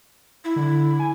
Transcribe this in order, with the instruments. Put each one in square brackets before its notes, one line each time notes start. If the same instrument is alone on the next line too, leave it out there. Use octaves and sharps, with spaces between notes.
[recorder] E4
[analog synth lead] D3
G#5